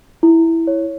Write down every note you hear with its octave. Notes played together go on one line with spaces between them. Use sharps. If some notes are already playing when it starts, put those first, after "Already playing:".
E4
C#5